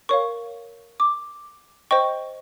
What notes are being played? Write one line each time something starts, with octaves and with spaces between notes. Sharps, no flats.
A#4 C#5 F5 C#6
D6
C5 D#5 G5 C#6